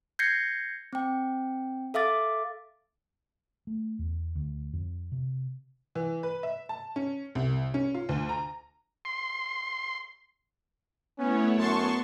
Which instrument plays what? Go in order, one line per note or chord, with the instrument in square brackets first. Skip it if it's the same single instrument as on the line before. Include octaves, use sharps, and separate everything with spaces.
[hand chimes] G6 G#6 A#6 C7 C#7
C4 G5
A4 E5 F5 D6 A6
[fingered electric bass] A3
E2
D2
F2
C3
[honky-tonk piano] E3
B4
E5
A5
C#4
C2
C#4
F4
D2
A#5
[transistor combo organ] C6
[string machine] A3 E4 C#5 [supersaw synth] B3 [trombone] C#4
[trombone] F#2 [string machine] B3 [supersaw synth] A5 C6 C#6